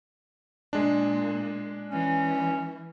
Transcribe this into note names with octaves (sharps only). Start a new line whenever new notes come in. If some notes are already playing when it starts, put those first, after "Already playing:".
A#2 G#3 D4
E3 C#4